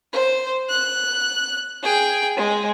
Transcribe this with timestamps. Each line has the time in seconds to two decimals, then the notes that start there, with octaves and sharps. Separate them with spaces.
0.13 C5
0.69 F#6
1.83 G#4 G5
2.37 G#3